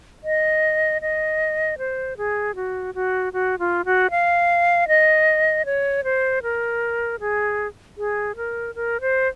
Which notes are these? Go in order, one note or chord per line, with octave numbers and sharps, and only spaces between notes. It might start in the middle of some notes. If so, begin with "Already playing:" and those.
D#5
D#5
C5
G#4
F#4
F#4
F#4
F4
F#4
F5
D#5
C#5
C5
A#4
G#4
G#4
A#4
A#4
C5